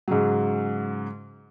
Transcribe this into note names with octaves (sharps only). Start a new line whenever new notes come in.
G#2 C#3 F#3